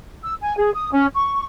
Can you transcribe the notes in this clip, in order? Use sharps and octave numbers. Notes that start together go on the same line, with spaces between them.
E6
G#5
G#4
D#6
C#4
C#6